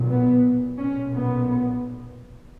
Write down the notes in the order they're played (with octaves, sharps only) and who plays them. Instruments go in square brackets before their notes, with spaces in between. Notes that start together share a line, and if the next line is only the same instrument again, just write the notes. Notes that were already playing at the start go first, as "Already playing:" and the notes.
Already playing: [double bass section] B1 A#2
B3
B1 A#2 C#4
B3